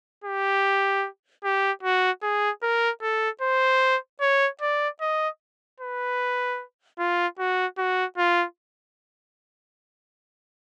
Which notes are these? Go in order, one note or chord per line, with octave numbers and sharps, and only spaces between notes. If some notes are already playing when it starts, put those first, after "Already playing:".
G4
G4
F#4
G#4
A#4
A4
C5
C#5
D5
D#5
B4
F4
F#4
F#4
F4